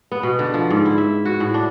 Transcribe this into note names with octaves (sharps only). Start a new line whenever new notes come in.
B3
B2
D3
F3
G#2
E4
E5
F#4
A2
D4